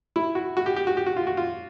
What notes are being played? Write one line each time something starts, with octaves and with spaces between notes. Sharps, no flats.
E4
F#4
F#4
G4
G4
F#4
G4
F#4
F4
F#4
F4